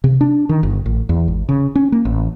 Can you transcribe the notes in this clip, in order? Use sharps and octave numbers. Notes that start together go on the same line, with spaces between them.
C3
D4
D#3
G1
A1
E2
G#1
C#3
C#4
A#3
A1